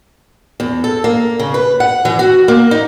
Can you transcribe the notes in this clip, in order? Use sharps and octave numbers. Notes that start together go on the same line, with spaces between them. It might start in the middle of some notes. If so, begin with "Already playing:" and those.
E2
A4
A#3
C#3
B4
F#5
E3
F#4
A#3
D#4